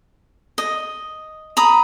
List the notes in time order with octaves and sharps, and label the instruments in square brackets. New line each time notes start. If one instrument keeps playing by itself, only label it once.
[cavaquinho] D#5
A#5 B5 D#6